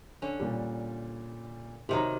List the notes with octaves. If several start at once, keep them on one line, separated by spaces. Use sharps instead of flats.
D3 C#4
A#2 G3
C3 D#3 F#3 G4 A#5